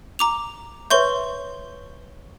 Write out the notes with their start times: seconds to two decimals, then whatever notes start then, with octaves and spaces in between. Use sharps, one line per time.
0.19 A#5 D6 F7
0.90 B4 C#5 E5 C6 C#6 G6